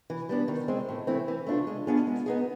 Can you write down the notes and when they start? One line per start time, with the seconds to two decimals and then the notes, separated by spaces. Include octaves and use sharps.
0.10 E3
0.29 G3 B3 D4
0.48 D#3
0.68 G#3 C4
0.89 A2
1.07 E3 A3 C4 E4
1.28 E3
1.47 A3 D4 F4
1.67 G#3
1.87 B3 D4 F4 G#4
2.07 G#3
2.26 B3 D#4 G#4